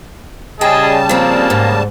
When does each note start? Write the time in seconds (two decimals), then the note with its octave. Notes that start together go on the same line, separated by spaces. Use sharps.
0.61 C#3 G3 G#4 D#5 G5 A5
1.09 F3 A#3 C4
1.50 G#2